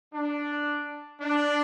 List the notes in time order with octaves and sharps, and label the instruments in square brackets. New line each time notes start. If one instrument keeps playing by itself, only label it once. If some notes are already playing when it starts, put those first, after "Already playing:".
[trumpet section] D4
D4